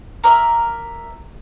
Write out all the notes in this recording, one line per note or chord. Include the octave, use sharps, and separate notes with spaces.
A#4 D5 E5